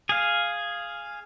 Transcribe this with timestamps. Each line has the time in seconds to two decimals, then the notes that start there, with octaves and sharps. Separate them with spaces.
0.09 G#4 F5